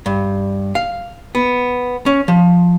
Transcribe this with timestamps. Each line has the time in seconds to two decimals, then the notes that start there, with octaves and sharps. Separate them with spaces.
0.06 G2
0.75 F5
1.35 B3
2.06 C#4
2.28 F3